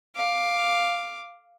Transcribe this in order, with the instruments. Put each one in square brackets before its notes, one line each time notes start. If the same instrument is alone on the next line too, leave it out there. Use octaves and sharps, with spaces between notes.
[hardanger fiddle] F5 D6